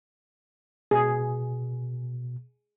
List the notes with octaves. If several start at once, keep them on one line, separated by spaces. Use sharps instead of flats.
B2 G#4